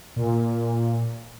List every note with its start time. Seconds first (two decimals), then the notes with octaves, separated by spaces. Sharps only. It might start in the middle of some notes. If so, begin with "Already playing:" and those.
0.16 A#2